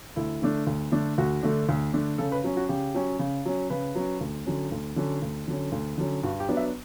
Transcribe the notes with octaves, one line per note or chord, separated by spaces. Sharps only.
D2 E4
D3 A3 D4
D2
D3 A3 D4
D2 F#4
D3 A3 D4
D2
D3 A3 D4
C#3 A4
B4
F#3 C#4
F#4
C#3 G4
F#3 C#4
C#3
F#3 C#4
C#3 B4
F#3 C#4
D2
D3 F#3 C#4
D2
D3 F#3 C#4
D2
D3 F#3 C#4
D2
D3 F#3 C#4
G2 F#4
G4
F#3 B3 D4
E5